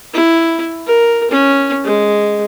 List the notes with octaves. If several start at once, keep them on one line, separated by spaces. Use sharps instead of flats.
E4
A#4
C#4
G#3